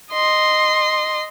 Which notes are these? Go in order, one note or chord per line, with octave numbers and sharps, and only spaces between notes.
D#5 C6